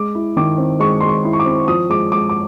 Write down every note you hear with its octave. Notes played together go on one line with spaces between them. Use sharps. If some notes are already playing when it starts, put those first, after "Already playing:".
Already playing: G#3 D6
E4
D#3 D6
C4
G#3 C#6
G#3 C6
C#6
E4
C#6
D6
C4
F3 D#6
G#3 D6
G#3 D6
D6